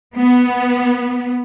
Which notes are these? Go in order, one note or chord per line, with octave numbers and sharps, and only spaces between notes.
B3